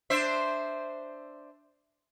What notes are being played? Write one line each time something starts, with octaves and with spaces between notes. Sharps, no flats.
D4 C5 E5